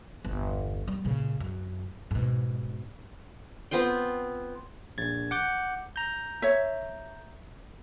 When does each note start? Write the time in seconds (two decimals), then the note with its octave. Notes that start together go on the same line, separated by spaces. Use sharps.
0.25 G1 E2
0.88 G3
1.05 A#2 C#3
1.40 F#2
2.11 G#2 B2
3.71 B3 C4 F4 G5
4.98 A#1 G#6 A6
5.31 F#5 D6 G6
5.96 A#5 G6
6.42 C#5 E5